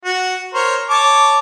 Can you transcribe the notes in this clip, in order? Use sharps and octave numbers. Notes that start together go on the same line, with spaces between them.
F#4
A#4 C5 C#5
C#5 A5 D6